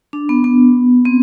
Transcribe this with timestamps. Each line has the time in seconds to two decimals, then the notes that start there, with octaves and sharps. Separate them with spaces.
0.13 D4
0.29 B3
0.44 B3
1.05 C4